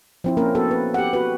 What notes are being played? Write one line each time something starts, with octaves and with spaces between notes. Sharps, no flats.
F3 C4 E4
A#3 C#4 A#4
B3 F#4 A4
B4
G4 F#5
F#4 B4